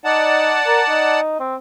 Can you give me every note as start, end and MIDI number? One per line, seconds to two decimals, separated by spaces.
0.05 0.55 63
0.05 1.20 74
0.05 1.20 78
0.05 1.20 81
0.67 0.81 70
0.89 1.36 63
1.40 1.56 60